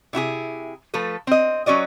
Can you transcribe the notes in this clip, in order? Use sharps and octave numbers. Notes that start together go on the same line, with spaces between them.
C3 E4 F#4 G#4
F3 A3 A4 B4
C4 D#5
F#3 C#4 F#4 D5 D#5